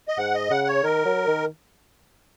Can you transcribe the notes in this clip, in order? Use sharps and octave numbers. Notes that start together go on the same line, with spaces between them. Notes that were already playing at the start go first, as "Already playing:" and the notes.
D#5
G#2 F#5
D#5
C#3 F#5
C#5
D#3 A#4
F#3
D#3